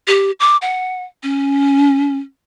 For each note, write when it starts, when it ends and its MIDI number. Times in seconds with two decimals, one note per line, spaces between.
0.08 0.31 67
0.40 0.57 86
0.62 1.04 78
1.23 2.18 61